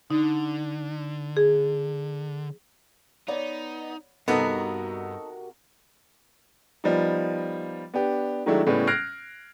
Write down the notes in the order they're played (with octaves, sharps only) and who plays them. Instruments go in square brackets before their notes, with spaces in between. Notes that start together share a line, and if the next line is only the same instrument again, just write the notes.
[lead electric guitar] D3 [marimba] D#4
[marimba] G#4
[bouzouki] B3 [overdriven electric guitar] D#4 [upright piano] C#5 D5
[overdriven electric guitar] G2 [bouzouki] C3 F#4 A#4 [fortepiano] B3 [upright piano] D#4 A4
[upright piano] F3 G3 B3 D#4
B3 D4 G4
D#3 F#3 G#3 A3 D4 E4
A2 C#3 G3 G#3 B3 C#4
F6 F#6 G#6 A#6 C7 D7